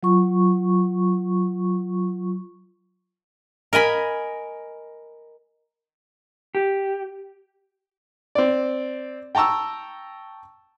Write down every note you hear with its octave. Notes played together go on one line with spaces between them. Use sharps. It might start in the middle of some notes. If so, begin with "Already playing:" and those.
F#3 F4 C#6
A#4 D#5 G#5 B5
G4
C4 D5
G5 A5 A#5 C#6 E6